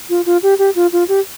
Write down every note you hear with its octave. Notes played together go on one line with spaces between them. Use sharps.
F4
F4
G4
G4
F4
F4
G4